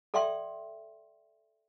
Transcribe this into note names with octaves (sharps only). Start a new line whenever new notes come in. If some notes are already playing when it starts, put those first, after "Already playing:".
A4 D5 E5 G5 C6